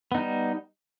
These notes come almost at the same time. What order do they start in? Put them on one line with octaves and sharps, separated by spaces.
B3 D#4 G3